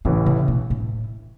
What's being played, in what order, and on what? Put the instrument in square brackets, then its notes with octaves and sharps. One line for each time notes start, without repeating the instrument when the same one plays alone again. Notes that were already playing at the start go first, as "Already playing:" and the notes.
[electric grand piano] A1 A2 E3 [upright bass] C#3
[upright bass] C#3
B2
A2